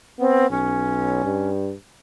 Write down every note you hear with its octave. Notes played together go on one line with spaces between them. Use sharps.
B3 C4
B1 C#4
G2